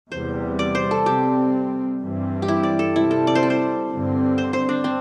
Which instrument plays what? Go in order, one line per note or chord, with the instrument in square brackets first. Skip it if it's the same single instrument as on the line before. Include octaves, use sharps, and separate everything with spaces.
[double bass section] E2 C3 G3 [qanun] C5
[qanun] D5
C5
A4
[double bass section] C3 G3 C4 [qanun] G4
[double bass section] G2 E3 G3 C4
[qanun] G4
E4
D5
A4
[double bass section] C3 G3 C4 [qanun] E4
[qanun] A4
D5
C5
A4
C5
[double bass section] G2 D3 C4
[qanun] C5
C5
D4
C4